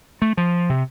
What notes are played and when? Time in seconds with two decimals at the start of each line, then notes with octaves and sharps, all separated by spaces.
0.22 A3
0.37 F3
0.70 C3